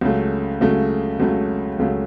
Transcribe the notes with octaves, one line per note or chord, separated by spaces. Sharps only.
C#2 C#3 F#3 A3
C#2 C#3 F#3 A3
C#2 C#3 F#3 A3
C#2 C#3 F#3 A3